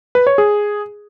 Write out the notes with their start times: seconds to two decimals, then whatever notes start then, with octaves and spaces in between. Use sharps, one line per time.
0.15 B4
0.27 C#5
0.38 G#4